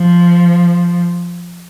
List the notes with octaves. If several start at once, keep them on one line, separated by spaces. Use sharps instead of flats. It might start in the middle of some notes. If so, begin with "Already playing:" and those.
Already playing: F3